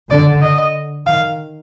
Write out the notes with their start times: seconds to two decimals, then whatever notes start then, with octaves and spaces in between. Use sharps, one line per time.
0.10 D3 D5
0.42 D#5
1.06 D#3 F5